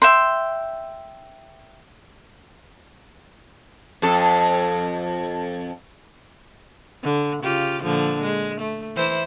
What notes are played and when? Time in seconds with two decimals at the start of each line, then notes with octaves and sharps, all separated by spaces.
0.02 E5 G5 C6
4.02 F2 A4
7.03 D3
7.43 C#3 F4 G4
7.83 A#2 D3 F3
8.22 G#3
8.60 A3
8.96 E3 E4 C5